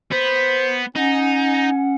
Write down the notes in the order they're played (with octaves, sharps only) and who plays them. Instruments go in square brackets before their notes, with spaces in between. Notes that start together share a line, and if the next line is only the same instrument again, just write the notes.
[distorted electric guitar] B3 [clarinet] C5
[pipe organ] C#4 F#5 [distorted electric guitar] D#4 [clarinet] G#5